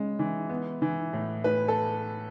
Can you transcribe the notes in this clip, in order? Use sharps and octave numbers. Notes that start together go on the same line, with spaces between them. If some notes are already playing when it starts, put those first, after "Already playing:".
Already playing: C#3 G#3
E3
B3
E3
A2
A2 B4
A4